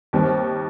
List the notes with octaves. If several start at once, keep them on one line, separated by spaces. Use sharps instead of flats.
D#2 D#3 G3 C4